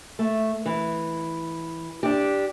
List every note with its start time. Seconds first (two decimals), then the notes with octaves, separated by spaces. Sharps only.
0.19 A3
0.66 E3
2.03 D4 G4